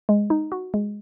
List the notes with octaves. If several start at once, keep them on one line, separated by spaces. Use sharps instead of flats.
G#3
D#4
F#4
G#3